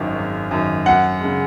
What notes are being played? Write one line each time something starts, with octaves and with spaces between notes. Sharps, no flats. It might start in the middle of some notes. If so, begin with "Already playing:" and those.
Already playing: G#1 F#2 D#3
G#1
F#2 D#3
F#2 F#5
C#3 G#3